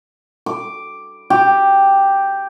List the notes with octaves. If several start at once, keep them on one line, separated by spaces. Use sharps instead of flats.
D6
G4